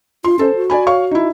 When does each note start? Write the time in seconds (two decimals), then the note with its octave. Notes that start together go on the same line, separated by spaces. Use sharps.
0.24 F4 C6
0.39 C#4 A4 C5
0.55 F#4
0.70 D5 G#5 B5
0.87 C#5 F5 C#6
1.11 D#4 E4